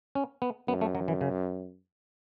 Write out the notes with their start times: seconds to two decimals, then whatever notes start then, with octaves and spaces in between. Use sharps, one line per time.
0.15 C#4
0.42 B3
0.68 F#2 B3
0.81 A3
0.95 F#3
1.08 E3
1.21 C#3